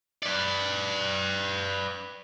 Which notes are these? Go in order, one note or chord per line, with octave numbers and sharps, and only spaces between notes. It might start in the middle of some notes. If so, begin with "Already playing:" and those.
B4 D5